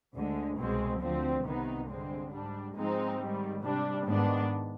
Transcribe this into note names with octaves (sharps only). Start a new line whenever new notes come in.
D2 D3 G#3
C2 B2 G#3 C4
D2 D3 F3 C4
C2 C3 D#3 B3 D#4
G2 D3 G#3 C4
G#2 G3 D4
G#2 F3 G#3 C4 D#4
G#2 D#3 G3
C3 G3 D4
G#2 D#3 B3 D4